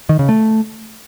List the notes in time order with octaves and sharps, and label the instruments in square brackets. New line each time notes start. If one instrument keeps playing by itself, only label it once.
[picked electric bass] D#3
C#3
A3